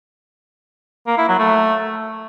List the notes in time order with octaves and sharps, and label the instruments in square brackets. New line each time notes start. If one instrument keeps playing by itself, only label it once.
[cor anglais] A#3
E4
F#3
A3